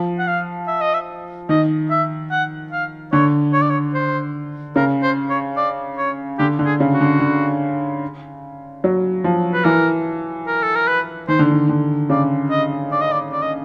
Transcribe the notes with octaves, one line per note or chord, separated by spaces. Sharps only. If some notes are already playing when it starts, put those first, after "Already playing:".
Already playing: F3
F#5
F5
E5
D#5
E5
D#3 D#5
E5
F#5
F5
D3 C#5
C#5
D5
C#5
C5
C#3 A#4
C5
C#5
D5
C#5
D3 G4
D3
G#4
C#3
F#4
D3
D3
F#3
F3
B4
E3 A#4
A#4
A4
A#4
B4
D#3 C5
D3
D#3
D3
C#3 D5
D#5
D5
D#5
D5
D5
D#5